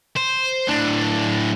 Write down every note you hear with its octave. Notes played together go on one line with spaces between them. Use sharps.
C5
A2 D4